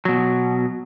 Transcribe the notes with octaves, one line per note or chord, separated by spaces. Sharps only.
B2 F#3